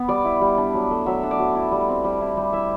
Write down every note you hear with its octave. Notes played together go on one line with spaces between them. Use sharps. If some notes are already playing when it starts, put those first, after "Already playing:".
Already playing: B3
G3 D5
E4
G3
D4
F#3
A3
F#3 E5
D4
D5
F#3
E4
G3
C4
G3
E4
G3
E4 E5